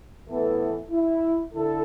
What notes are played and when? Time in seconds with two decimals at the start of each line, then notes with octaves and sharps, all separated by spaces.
0.28 A2 E3 B3 E4 A4
0.91 E4
1.53 D3 E4 A4